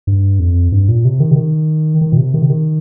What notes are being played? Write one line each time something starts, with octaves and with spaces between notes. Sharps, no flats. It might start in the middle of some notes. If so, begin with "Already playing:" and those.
G2
F2
G2
A#2
C3
D#3
C3
D#3
D#3
A#2
C3
D#3
C3
D#3